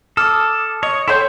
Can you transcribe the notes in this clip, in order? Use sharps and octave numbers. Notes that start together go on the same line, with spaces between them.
A4 D6 D#6 F6
C#5 D#5
E4 A4 C5 C#5 G5 C6 G6